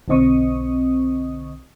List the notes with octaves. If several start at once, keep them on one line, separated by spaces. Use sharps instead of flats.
B1 D3 C4 D#5 C#6 D#6